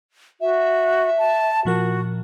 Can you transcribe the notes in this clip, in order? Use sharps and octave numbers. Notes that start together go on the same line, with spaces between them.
F#4 E5
A5
A#2 F3 F#4 A#4